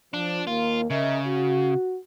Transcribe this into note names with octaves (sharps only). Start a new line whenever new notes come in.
F3 D4
D#2 A#3 F4
C#3 A#4 D#5 E5
F#4